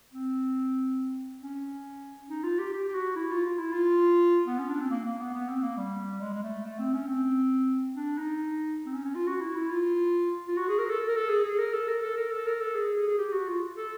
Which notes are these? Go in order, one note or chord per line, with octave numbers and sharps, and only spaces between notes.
C4
C#4
D#4
F4
G4
G4
G4
F#4
E4
F4
F4
E4
F4
B3
C#4
D4
C4
A#3
A#3
B3
B3
C4
A#3
G3
G#3
G#3
A3
A3
C4
C#4
C4
D4
D#4
C4
C#4
C#4
F4
F#4
E4
E4
F4
F4
F#4
G#4
A#4
A4
A#4
A4
G#4
G#4
A#4
A4
A#4
A4
A#4
A4
A#4
A4
G#4
G#4
G#4
G4
F#4
F4
A4